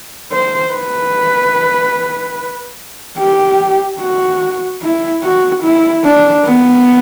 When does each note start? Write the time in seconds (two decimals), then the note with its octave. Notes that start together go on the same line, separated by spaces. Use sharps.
0.32 C5
0.73 B4
3.18 G4
4.00 F#4
4.83 E4
5.23 F#4
5.63 E4
6.04 D4
6.45 B3